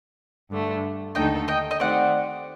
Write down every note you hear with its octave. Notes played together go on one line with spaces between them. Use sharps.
G2 D3 A3
D#2 D3 A3 D#4 A4 D#5 G5
D#5 G5
D#5
D#3 A3 C4 G4 D5 F#5